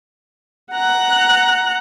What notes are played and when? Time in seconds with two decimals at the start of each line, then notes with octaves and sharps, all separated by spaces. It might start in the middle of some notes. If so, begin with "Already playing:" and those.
0.73 F#5 A#5 F#6